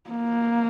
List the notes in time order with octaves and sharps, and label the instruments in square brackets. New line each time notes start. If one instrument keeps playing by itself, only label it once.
[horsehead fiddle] A#3